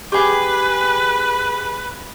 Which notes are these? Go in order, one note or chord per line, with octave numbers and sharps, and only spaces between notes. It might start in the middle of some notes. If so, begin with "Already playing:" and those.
G4 G#4 B4